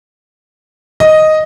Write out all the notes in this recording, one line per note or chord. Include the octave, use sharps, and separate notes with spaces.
D#5